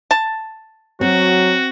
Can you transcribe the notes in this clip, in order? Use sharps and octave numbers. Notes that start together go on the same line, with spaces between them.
A5
F#3 C4 F#4